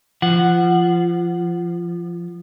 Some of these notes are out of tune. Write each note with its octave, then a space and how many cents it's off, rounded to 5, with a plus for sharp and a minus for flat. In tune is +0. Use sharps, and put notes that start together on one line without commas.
F3 -20 F#5 +0